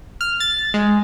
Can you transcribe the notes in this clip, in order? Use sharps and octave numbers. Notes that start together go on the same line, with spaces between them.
F6
A6
G#3